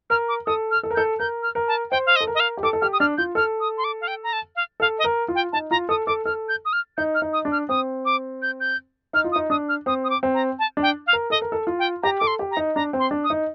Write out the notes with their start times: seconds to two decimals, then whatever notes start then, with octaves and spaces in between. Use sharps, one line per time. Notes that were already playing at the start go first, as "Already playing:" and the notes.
0.10 A#4 F6
0.28 D6
0.46 A4 D#6
0.71 F6
0.83 A4
0.90 A#4
0.95 A4 G6
1.19 A#4 G6
1.43 F6
1.55 A#4
1.68 A5
1.91 C5 G5
2.06 F5
2.16 D#5
2.21 A4
2.27 A#4
2.35 D#5
2.40 F5
2.57 G4
2.63 A4 D6
2.73 A4
2.81 G4 F6
2.93 D#6
3.00 D4 F6
3.17 F4 G6
3.35 A4 F6
3.60 D#6
3.78 C6
3.84 D6
4.01 F5
4.07 G5
4.23 A#5
4.33 A5
4.56 F5
4.80 A4 F5
4.99 D#5
5.04 A#4
5.28 F4
5.35 G5
5.52 D#4 A5
5.71 F4 A#5
5.89 A4 D#6
6.07 A4 D6
6.25 A4 F6
6.49 G6
6.65 D#6
6.73 F6
6.97 D#4 G6
7.15 F6
7.22 D#4
7.33 D#6
7.45 D4
7.52 F6
7.69 C4 D#6
8.05 D6
8.42 G6
8.60 G6
9.13 D#4 F6
9.24 F4
9.32 D#6
9.36 D#4
9.50 D4 D#6
9.69 F6
9.86 C4 D#6
10.04 D#6
10.10 D6
10.23 C4
10.34 A#5
10.59 A5
10.77 D4
10.82 G5
11.07 F5
11.13 A#4
11.30 A4 D#5
11.42 A#4
11.52 A4
11.67 F4
11.79 G5
12.03 G4 A#5
12.19 A4 D6
12.27 C6
12.39 G4
12.51 A#5
12.57 D#4
12.75 D4 A#5
12.93 C4
12.99 C6
13.11 D4
13.24 D#6
13.30 D#4